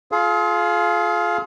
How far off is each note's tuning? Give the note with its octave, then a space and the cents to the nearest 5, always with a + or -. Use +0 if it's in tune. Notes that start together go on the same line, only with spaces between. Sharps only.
F4 +0 G#4 +40 F5 +0